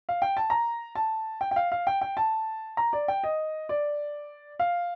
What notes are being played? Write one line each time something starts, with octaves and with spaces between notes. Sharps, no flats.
F5
G5
A5
A#5
A5
G5
G5
F5
F5
G5
G5
A5
A#5
D5
G5
D#5
D5
F5